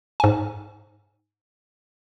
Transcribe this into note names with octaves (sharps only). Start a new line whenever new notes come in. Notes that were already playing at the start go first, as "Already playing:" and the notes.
G#2 G#5